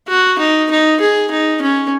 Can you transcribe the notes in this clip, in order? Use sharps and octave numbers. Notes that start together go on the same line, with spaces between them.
F#4
D#4
D#4
G#4
D#4
C#4